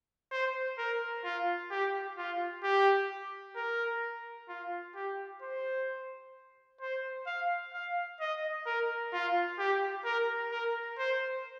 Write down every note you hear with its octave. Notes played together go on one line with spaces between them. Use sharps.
C5
A#4
F4
G4
F4
G4
A#4
F4
G4
C5
C5
F5
F5
D#5
A#4
F4
G4
A#4
A#4
C5